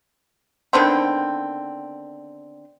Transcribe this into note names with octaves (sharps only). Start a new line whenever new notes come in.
D3 D#3 B3 C4